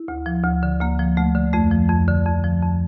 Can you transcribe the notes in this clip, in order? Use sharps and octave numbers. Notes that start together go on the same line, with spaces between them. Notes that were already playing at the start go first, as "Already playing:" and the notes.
Already playing: E4
D2
F3
D2
D3
D2 A#3
F3
D2 A3
D3
F2 A3
F3
F2
D3
F2
F3
F2